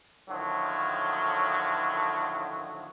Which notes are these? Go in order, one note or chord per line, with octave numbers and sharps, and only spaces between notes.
A2 D3 D#3 F3 F#3